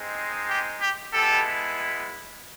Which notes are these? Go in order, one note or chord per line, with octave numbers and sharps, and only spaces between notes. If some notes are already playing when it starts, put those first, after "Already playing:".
Already playing: G#3 C4 D#4
G4
G4
G#3 B3 E4 G4 A4